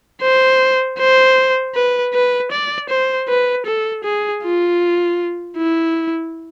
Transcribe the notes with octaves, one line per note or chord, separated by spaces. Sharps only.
C5
C5
B4
B4
D5
C5
B4
A4
G#4
F4
E4